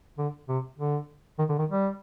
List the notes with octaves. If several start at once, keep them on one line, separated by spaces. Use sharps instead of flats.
D3
C3
D3
D#3
D3
D#3
G3